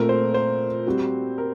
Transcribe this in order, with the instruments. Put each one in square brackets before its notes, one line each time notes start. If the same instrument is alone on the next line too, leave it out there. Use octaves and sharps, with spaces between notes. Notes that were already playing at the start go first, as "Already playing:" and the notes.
Already playing: [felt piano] A#2 A3 C4 [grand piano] A#4
[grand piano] C5
C5
[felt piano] G3 C4 F#4
[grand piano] A#4